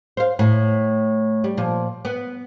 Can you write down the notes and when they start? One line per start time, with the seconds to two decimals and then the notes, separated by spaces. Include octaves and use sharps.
0.17 C5 F5
0.39 A2
1.44 G3
1.57 A#2 F3
2.05 B3